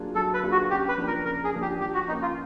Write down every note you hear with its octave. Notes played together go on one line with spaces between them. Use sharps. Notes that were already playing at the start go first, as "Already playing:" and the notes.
Already playing: F#3 A#3 D4 F4 G#4
F#3 A4
B4
A#3 D4 F4 G#4
F#4
C#3 G4
B4
F3 A#3 D4
A#4
C#3 A#4
G#4
F3 A#3 D4
G4
F3 G4
F#4
A#3 C#4 D#4
F4